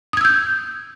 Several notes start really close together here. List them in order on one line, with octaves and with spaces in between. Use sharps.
D#6 G#6 E6 G6